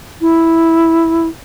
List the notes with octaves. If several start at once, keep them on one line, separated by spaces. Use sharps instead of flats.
E4